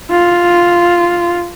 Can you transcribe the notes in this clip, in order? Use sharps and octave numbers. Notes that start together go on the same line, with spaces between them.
F4